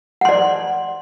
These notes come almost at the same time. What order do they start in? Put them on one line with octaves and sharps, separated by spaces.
F#5 C6 D5